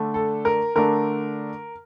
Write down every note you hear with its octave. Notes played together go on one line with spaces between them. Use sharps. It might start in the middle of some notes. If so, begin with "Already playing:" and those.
Already playing: D3 A3 D4
A4
A#4
D3 A3 D4 A#4